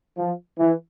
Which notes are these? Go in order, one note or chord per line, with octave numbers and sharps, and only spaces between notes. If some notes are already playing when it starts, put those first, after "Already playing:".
F3
E3